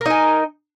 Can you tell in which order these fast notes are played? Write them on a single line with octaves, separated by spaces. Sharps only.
A#4 D#4 G#5